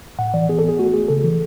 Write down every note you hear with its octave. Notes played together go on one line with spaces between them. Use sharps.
A2 F#5
E3 D5
B3 G#4
A4
B3
G#4
A3 F#4
A3 G#4
C#3 A4
E3